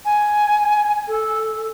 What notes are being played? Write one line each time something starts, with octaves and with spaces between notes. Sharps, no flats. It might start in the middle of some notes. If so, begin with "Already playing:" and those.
G#5
A4